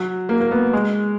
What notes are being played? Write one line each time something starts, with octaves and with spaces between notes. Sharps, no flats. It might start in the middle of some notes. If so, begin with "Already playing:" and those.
Already playing: F#3
A#3
A#3
B3
G#3